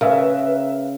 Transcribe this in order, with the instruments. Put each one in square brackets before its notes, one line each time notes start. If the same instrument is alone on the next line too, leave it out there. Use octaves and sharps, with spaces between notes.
[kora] C#3 [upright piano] A#4 E5 F5 [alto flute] B4